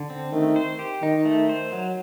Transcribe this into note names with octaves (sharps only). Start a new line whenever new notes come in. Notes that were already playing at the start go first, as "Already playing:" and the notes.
Already playing: D3
C4
D#3 A3
C5
G4
D#3 D#4
A3
C5
F#3